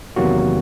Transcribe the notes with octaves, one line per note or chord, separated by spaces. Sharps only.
E2 C3 D#3 F#3 A#3 F#4